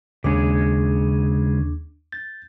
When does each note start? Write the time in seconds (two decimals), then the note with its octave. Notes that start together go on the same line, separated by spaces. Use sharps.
0.24 D#2 C#3 G#3 D4 G#4 D6
2.12 G6 A6